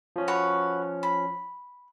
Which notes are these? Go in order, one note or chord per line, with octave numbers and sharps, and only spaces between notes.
F3 C#4
F#4 B4 C#5
B5